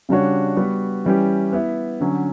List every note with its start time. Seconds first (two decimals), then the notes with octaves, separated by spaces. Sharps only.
0.09 C#3 G3 D4 F#4 C#5
0.57 G3 B3 F#4 B4
1.05 E3 G3 C#4 G4
1.52 B3 E4 B4 E5
2.00 D3 F#3 C#4